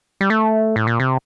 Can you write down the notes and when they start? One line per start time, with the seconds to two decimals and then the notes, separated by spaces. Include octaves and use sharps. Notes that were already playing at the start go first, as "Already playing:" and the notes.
0.21 G3
0.30 A3
0.76 A2
0.87 A#2
1.00 C3